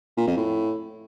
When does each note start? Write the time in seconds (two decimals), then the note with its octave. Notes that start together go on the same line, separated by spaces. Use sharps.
0.18 A#2
0.27 F2
0.37 A2